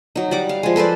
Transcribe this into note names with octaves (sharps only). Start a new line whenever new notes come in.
F#3 D#4
G3 F#5 D6
F5
F3 G#3
A4 B4 C5 D5